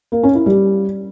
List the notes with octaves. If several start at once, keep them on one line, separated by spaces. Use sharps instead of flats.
A#3
C#4
E4
G3